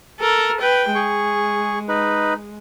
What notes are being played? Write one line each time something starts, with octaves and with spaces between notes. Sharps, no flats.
A4 A#4
B4 G5
G#3 G#4 C#6
D#4 B4